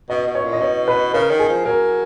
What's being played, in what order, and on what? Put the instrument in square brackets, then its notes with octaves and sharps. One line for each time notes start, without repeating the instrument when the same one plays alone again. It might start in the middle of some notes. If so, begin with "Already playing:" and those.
[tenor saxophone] B2 [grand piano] D#5
[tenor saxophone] B2
[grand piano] C#5
[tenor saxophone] A#2
[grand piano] D#5
[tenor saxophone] B2 [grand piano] C#5
[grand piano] B4
[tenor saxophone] C#3 [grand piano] A#4
[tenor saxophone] D#3
[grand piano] G#4
[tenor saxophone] F3
[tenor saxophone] F#3 [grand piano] A#4